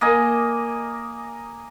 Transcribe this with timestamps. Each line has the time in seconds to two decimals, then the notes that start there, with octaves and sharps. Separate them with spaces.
0.01 A#3 D#5 G#5